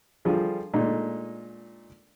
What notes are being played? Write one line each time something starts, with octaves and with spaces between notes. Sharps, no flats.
D3 F3 G3 F4 G#4
A#2 D3 G#3 A3 D4 D#4